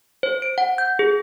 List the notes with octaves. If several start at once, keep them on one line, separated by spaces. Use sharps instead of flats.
C5
D7
F#5
G6
G#4